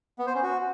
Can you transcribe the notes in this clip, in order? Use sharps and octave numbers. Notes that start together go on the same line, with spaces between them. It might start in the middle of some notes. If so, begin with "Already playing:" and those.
B3
C5
C#4
F#4